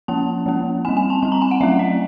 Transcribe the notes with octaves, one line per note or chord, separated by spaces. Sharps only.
F3 A#3 C#4 A5
F3 A#3 C#4
G3 C4 G#5
G#5
A5
G3 C4 A5
A#5
G#5
F#5
F#3 A3 C#4 E5
D#5